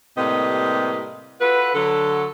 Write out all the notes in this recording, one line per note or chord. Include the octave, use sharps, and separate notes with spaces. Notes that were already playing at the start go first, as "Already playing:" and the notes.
A2 C3 G3 A#3 B4 D#5
F4 F#4 A4 B4
D3 F#3 A4